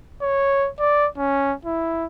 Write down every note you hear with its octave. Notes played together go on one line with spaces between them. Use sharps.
C#5
D5
C#4
E4